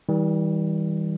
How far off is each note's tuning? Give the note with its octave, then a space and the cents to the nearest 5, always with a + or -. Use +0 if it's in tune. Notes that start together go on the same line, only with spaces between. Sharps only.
E3 -45 G3 +0